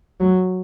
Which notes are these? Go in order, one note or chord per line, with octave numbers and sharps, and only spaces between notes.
F#3